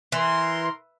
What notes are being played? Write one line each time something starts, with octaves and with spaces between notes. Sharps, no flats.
E3 A#4 C6